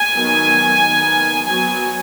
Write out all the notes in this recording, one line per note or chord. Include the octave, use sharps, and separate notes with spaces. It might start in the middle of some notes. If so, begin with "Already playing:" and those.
Already playing: G#5
D#3 F#3 B3
D#3 B3
F#3 B3 G#5